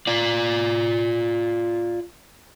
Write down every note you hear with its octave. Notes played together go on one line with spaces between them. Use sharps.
F4 D5